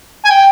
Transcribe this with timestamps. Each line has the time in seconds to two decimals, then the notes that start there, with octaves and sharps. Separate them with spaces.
0.25 G#5
0.30 G5